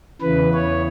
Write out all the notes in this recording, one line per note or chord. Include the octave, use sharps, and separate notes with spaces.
E2 C#3 E3 B4
C#5